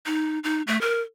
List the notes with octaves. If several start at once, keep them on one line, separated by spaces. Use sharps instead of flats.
D#4
D#4
A3
A#4